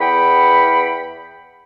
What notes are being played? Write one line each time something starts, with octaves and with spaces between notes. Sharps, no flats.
E2 F#5 G5 B5